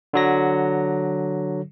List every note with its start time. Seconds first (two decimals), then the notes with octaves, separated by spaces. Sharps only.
0.13 D3 F#3 A#6